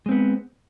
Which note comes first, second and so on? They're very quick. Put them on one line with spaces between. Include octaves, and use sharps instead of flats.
G#3 C4 B3